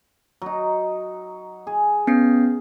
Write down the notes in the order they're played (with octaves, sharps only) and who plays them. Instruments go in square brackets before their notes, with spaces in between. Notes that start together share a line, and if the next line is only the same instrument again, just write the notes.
[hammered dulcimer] F#3 D#4
G#4
[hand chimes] B3 C#4 C7